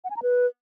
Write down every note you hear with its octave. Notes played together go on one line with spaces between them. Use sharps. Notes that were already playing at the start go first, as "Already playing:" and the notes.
F#5
G#5
A#5
B4